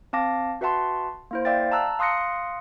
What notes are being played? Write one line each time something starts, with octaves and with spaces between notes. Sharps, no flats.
C4 F5 A5 D6 A#6
F#4 B4 E5 F#5 A5 C6
A#3 E4 C5
D5 E5 F5 G5 A6
A5 A#5 E6 F#6
F5 C6 D#6 F#6 A#6 C#7